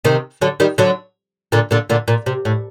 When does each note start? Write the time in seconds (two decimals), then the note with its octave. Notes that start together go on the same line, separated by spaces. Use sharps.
0.05 C3 D#3
0.41 D3 F#3
0.60 D#3 G3
0.78 D3 F#3
1.52 A#2 D3
1.71 A#2 D3
1.90 A#2 D3
2.08 A#2
2.26 C3
2.45 A2